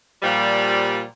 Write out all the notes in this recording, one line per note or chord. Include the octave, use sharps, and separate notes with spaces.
A#2 F3 G3